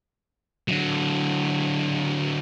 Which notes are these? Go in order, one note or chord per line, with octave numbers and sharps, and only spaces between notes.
D3 F#3